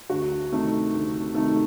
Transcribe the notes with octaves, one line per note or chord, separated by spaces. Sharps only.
D2 F#4
C3 D#3 A3 D#4
D2
C3 D#3 A3 D#4